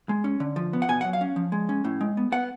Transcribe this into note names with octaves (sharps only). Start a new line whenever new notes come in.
G#3
C#4
D3
F3
B3
F#5
B2 G#5
F#5
F#3
F5
C#4
F3
G#3
C#4
A2
G#3
B3
B3 F#5